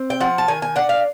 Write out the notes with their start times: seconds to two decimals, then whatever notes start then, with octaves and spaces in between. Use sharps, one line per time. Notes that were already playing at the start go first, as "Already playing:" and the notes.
Already playing: C4
0.10 G5
0.20 F3 F#5
0.38 A5
0.48 D#3 G#5
0.62 G#5
0.76 D4 F#5
0.89 F5